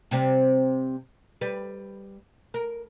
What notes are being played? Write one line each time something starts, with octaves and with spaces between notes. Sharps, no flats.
C3 G3 C4
G3 B4
A#4